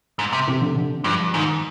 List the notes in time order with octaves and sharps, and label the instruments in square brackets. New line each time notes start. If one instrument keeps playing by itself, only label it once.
[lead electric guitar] G#2
C3
[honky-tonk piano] C3
D3
D3
[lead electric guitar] G2 [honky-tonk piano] F3
[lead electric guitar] G#2 [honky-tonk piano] D#3